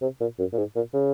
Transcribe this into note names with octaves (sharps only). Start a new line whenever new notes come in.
C3
A#2
F#2
A#2
G#2
A#2
C#3